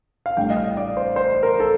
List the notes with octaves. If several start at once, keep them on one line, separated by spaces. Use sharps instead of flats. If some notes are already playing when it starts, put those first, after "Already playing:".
F5
A1 A2 G3 D4 G5
D#5
F5
D5
C5
C5
A#4
A4